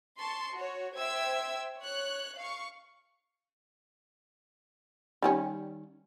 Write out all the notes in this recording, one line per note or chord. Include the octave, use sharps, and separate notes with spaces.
A5 C6 C#6
F#4 C#5
C5 E5 G5 E6 G#6
C#5 F#6
F5 C#6
D#3 G3 C#4